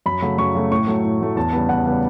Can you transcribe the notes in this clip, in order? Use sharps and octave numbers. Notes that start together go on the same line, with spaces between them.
F#2 B5
C#3 F#3 A3
F#2 C#6
C#3 F#3 A3
A2 C#6
F#3 A3
A2
F#3 A3
E2 A5
C#3 G3 B3
E2 F#5
C#3 G3 B3